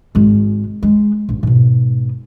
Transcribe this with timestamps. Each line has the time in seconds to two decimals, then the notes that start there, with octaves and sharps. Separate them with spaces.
0.15 G#1 G#3
0.83 G#3
1.29 A1
1.43 G#2 B2